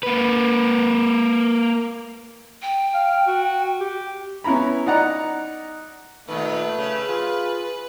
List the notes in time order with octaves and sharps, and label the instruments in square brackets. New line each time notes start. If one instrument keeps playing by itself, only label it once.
[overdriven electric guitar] A#3 B4
[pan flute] G5
[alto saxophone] F5
F#4
G4
[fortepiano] B3 C#4 E4 A#5 B5
D#4 D5 F#5 A#5
[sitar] A#2 D#3 [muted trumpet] A3 [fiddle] B4
[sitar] C#3
[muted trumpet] F4 [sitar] G#4